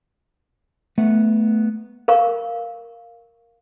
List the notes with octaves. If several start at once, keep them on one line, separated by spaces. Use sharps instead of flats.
A3 B3 F#5
A#4 F5 C#6